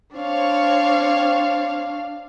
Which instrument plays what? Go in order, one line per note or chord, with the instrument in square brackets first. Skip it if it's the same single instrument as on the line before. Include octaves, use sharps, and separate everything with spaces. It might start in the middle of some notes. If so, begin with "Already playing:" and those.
[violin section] C4 C#5 [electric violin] D4 F5